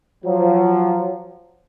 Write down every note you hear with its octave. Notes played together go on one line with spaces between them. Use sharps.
F3 F#3